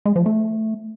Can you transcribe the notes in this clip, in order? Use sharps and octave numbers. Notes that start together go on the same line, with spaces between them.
G#3
F3
A3